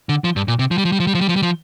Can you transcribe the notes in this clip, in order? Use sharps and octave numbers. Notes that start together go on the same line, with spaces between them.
D3
F3
G2
A#2
C3
F3
G3
F3
G3
F3
G3
F3
G3
F3
G3
F3